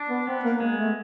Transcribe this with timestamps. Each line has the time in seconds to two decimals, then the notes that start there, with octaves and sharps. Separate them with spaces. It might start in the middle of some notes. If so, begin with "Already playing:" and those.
Already playing: D4
0.09 B3
0.26 B3 C4
0.44 A#3
0.60 G#3 A#3
0.78 A3